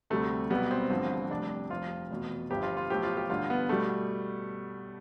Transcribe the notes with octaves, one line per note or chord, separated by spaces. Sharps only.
D2 C3 G3 A3
B1 B2 G3 B3
C4
A1 G2 D3 F3
F1 F2 C3 G3 D4
F1 F2 C3 F3 F4
F1 E2 B2
G1 G2 F3 G4
F4
F4
B1 A2 F3 G4
F4
G4
A1 G2 D3 F4
B3
B2 G3 A3